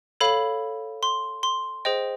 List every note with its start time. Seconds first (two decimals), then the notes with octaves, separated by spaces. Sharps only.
0.20 A4 C#5 F5 B5
1.03 C6
1.43 C6
1.85 G#4 C5 D#5 G5